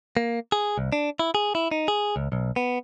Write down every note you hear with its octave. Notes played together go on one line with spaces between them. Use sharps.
A#3
G#4
C2
D4
E4
G#4
E4
D#4
G#4
C#2
B1
B3